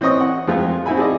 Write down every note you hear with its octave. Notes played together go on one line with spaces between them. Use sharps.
E3 C4 C#4 D#5 C#6 D#6
F#5
F2 F3 G#3 A3 F4
C4 D#4 E4 F#4 G#5 B5
G#4 A4 D5 D#5